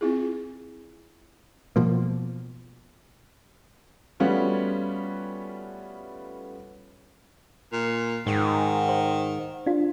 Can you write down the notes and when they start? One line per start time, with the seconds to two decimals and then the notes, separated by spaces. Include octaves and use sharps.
0.01 C4 E4 F4 G#4
1.76 B2 F3 A#3
4.20 G3 A3 B3 C#4 F4 F#4
7.73 A#2
8.27 G#2 D#3
8.89 C5
9.66 D4 F4